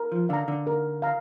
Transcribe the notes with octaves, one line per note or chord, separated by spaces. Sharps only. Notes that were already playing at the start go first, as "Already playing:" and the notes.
Already playing: A#4
F3
D3 F5 A#5
D3
A#4
F5 A#5